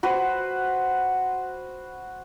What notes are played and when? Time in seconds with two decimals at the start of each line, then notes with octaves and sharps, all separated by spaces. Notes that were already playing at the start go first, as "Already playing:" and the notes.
0.03 F#4 B4 C5